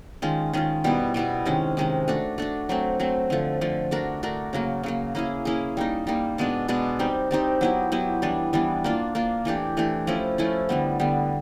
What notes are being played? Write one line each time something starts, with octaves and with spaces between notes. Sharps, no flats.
D#3 G#3 C#4 F4
D#3 G#3 C#4 F4
B2 G3 B3 E4
B2 G3 B3 E4
C3 D#3 G#3 C#4
C3 D#3 G#3 C#4
A3 D4 F#4
A3 D4 F#4
F#3 A3 C4
F#3 A3 C4
D3 F3 A3
D3 F3 A3
A3 D4 F#4 A#4
A3 D4 F#4 A#4
C#3 F#3 A#3
C#3 F#3 A#3
A#3 C#4 E4 G#4
A#3 C#4 E4 G#4
G3 A#3 D#4
G3 A#3 D#4
B2 G#3 B3 D4
B2 G#3 B3 D4
G3 C4 D#4 G4
G3 C4 D#4 G4
F#3 B3 E4 G4
F#3 B3 E4 G4
E3 G3 B3 D4
E3 G3 B3 D4
A#3 D4 F4
A#3 D4 F4
E3 A3 D4 G4
E3 A3 D4 G4
F3 A3 C#4 E4
F3 A3 C#4 E4
D3 G3 B3
D3 G3 B3